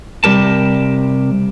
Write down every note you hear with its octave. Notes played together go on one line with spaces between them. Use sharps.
C3 G3 G4 A#4 A5